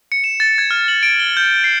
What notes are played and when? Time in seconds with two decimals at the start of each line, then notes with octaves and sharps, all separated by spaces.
0.12 C#7
0.24 E7
0.40 A6
0.58 G#6
0.71 F6
0.88 F#7
1.03 D7
1.19 G7
1.37 G6
1.64 C7